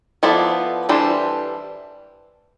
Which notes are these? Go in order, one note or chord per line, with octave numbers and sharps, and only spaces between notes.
F3 B3 E4 A4 D5
E3 G3 D4 A4 C5